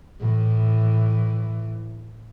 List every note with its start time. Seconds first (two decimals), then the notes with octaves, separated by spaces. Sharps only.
0.21 A2 E3